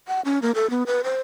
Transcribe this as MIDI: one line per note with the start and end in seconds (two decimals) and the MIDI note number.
0.08 0.21 78
0.25 0.39 61
0.42 0.51 58
0.55 0.70 69
0.70 0.83 59
0.87 1.01 71
1.04 1.21 72